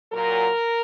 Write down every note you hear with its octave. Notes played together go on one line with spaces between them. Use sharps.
A#2 F#3 A#4